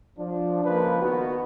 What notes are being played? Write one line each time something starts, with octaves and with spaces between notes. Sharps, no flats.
F3 D4
C#2 F3 A#3 B4
D#3 B3 F#4